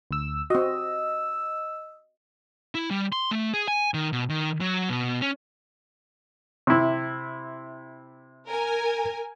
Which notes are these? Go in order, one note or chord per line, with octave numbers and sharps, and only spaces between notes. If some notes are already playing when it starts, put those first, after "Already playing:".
D2 E6
C4 F#4 D#5 E6
E4
G3
C6
A3
G#4
G#5
D#3
B2
D#3
F#3
B2
C#4
C3 E4
A#4 G#5